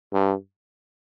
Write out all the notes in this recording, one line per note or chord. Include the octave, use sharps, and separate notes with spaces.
G2